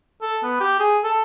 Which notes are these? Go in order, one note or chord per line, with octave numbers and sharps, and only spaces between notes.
A4
B3
G4
G#4
A4